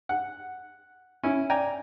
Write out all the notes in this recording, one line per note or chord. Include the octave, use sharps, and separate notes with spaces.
F#5
C#4 E4
D5 G5 G#5 A#5